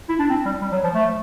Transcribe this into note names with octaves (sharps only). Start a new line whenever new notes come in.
E4
D4
C4
G3
G3
F#3
F3
A3